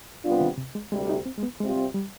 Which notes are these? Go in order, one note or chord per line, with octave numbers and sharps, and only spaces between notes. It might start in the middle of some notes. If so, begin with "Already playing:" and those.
C3 G3 B3 D4 F4
D#3
C3
G#3
D2 C3 G3 G#3
D#4
C4
G#3
B3
C3 G3 G#3 C4 F4
G3